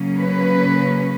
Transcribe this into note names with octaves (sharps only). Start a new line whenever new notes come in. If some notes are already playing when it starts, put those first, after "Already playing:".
Already playing: C#3 F#3 A#3 C#4
B4